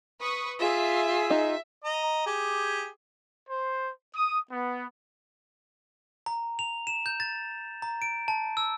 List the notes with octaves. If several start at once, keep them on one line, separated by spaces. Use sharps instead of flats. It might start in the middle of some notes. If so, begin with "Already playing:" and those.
B4 C#6 D#6
F4 G#4 E5
D#4
D#5 A#5
G4 G#4
C5
D#6
B3
A#5
F7
E7
G6
A6
A#5
D7
A5
E6